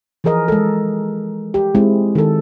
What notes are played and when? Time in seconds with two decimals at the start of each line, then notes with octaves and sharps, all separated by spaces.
0.24 E3 F3 G#4 A#4 D#5
0.48 G#3 A4
1.54 G4
1.75 G#3 C4 E4
2.15 D#3 A4